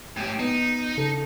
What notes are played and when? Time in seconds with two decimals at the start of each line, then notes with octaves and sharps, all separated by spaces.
0.17 A2 G4
0.39 B3 D#4
0.97 C#3 A4